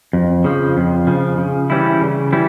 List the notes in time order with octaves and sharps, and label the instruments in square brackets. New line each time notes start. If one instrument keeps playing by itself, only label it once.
[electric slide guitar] F2
C#3 F3
F2
C#3 F3
C#3
E3 G3 C#4 E4
C#3
E3 G3 C#4 E4